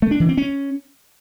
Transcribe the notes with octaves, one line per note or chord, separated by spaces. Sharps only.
A3
D4
E3
C4
C#4